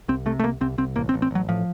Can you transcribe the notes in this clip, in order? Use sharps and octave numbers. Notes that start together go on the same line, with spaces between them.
C2 C4
C3 A3
A3
C2 A#3
C2 C4
C2 C4
A1 A#3
C4
A1
C4
A1 F#3
A2 F3